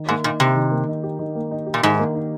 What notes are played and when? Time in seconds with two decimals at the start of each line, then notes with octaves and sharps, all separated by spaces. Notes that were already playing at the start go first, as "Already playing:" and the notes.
Already playing: D#3
0.09 G#2 A#3
0.24 A#2 D#4
0.40 C3 G4
0.56 D#3
0.71 A#3
0.88 D#4
1.03 G4
1.19 D#3
1.35 A#3
1.51 D#4
1.67 G4
1.74 A#2
1.83 G#2 D#3
1.99 A#3
2.15 D#4